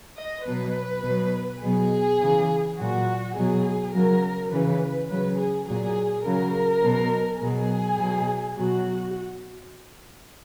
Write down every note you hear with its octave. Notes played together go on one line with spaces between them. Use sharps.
D#5
B2 F#3 B4
B2 F#3
B2 F#3 G#4
C#3 E3
A#2 F#3 F#4
B2 F#3 G#4
C#3 F#3 A#4
C#3 E3 B4
C#3 F#3 B4
G#4
A#2 F#3 G#4
C#3 F#3 A#4
B2 F#3
B2 F#3 G#4
B2 F#3
B2 F#3 F#4